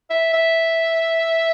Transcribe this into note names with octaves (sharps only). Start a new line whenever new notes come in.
E5
E5